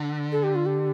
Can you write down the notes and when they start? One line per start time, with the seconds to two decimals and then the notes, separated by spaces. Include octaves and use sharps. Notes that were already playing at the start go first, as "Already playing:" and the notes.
Already playing: D3
0.32 A4
0.43 G4
0.55 F4
0.66 G4